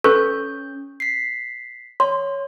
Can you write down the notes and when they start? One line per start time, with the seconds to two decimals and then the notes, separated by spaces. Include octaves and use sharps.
0.04 C#4 A4 B4 C#6 G6
1.00 B6 C7
2.00 C#5 C6